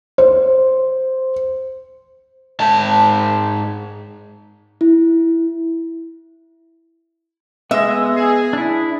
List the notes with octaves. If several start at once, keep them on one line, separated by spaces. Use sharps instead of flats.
C5
G#2 A5
E4
G#3 B3 D#5 E5
G#4
D4 E4